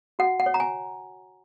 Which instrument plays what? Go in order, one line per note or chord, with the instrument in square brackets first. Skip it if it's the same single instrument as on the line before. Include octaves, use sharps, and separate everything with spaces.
[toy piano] F#4 F#5
F#5
C#5
A#5
G#5